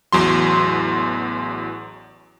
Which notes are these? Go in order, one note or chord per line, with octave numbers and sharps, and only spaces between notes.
A1 E2 F#3 C6